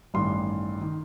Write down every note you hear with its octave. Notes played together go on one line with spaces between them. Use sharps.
A1 G2 D#3 C6
D#3